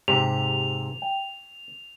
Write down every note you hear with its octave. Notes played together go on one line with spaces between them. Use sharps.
G#2 C3 G4 F7
G5